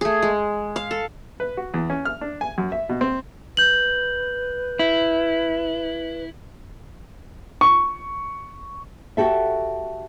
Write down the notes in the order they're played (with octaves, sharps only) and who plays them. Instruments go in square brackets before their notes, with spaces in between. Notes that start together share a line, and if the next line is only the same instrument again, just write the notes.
[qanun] A3 G#4
G#3
F5
A4
[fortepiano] B4
F#4
E2
C#4
F6
D4
G#5
F#2
E5
B2
C4
[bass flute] B4 [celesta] G6 F#7
[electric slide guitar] E4
[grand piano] C#6
[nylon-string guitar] F#4 G4 A4 E5